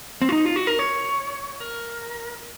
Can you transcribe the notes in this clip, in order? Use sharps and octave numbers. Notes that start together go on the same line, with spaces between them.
C4
F4
D#4
F4
F#4
A#4
C#5
A#4